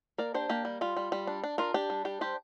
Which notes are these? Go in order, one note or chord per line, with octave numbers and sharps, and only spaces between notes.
A#3 A#4 D5
D4 G4 C5
A#3 G4
G3
G3 F4
G3
G3
D4
D4
D4 F4 A#4
D4 G4
G3
D4 G4
G3 G4 C5